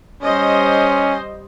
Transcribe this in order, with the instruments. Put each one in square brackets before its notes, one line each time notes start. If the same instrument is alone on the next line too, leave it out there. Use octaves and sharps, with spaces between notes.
[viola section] G3 C5 D#5 [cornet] C#4